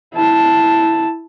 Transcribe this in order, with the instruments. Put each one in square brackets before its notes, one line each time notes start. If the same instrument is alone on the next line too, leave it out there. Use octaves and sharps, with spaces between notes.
[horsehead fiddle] E4 A5